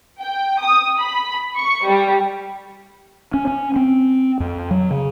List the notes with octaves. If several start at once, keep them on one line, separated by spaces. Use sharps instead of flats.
G5
D#6
B5
C#6
G3
C#4
C#4
C4
F2
F#3
C#3